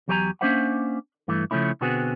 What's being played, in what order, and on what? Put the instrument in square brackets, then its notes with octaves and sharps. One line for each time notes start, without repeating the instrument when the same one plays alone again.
[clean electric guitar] E2 F#3 G4 A#4 G#5 A#5
A#3 C#4 D4 C5 E5 F#5
G2 E3 A3
C#3 F3 A3 C#4 E4
B2 D3 B3 C4 F#4 G#4